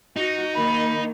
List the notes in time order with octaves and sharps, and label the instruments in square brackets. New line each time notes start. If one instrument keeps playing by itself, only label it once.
[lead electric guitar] D#4 [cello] F#4
[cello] D#3 A#3 [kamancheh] B5